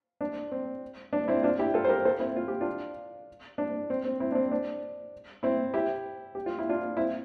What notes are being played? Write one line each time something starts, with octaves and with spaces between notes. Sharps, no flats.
D4
C4
D4
C4 E4
D4 F4
E4 G4
F4 A4
C5
G4 A#4
A4 C5
C4 E4
F4
G4
D4 F4
D4
C4
C4
C4 E4
D4
C4
D4
C4 E4
E4 G4
G4
F4
E4
D4 F4
C4 E4